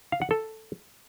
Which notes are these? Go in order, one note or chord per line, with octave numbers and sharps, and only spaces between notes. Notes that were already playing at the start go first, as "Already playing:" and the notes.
F5
F#5
A4